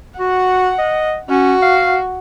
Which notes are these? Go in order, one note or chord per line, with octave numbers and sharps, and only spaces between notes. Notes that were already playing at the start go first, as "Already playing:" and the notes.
F#4 F#5
D#5
C#4 F#4
F5